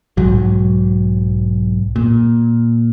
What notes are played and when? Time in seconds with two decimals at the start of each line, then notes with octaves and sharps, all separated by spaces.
0.17 B1 G#2 F#3
1.96 A#2